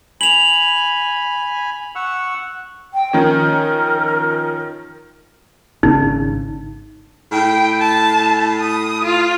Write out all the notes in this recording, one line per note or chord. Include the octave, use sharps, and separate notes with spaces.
G#5 B5 F7 F#7
F#5 C#6 E6
G5
D#3 F3 C#4 A#4
G#1 C#3 D4 D#4
A2 G5
A5
D#6
F4